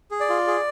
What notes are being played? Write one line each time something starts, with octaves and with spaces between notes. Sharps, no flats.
G#4
D5
F4
G#4